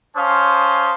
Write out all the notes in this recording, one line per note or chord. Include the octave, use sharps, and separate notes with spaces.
C#4 C5 F5 A5 C6 D#6